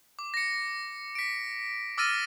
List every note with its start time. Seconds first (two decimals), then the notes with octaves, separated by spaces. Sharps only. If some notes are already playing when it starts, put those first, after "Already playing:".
0.19 D6
0.34 A#6 C#7
1.15 B6 D7
1.98 D6 E6 F6 A6 A#6 D#7